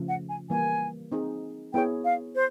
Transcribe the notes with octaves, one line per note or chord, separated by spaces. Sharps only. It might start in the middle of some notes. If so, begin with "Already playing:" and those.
Already playing: C#3 F3 A3
F#5
G#5
E3 G3 A#3 G#5
C4 D#4 G#4
B3 E4 G#4 C#5 G5
F5
C5